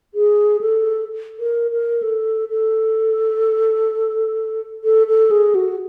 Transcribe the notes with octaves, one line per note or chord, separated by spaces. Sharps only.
G#4
A4
A#4
A#4
A4
A4
A4
A4
G#4
F#4